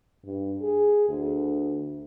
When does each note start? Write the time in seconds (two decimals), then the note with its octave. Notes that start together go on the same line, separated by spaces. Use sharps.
0.25 G2
0.62 G#4
1.08 D2